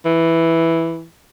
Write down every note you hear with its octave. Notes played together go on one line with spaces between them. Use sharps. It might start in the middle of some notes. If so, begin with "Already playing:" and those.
E3